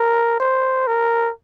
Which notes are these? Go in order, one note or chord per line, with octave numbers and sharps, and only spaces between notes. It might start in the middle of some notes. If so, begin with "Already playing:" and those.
Already playing: A#4
C5
A#4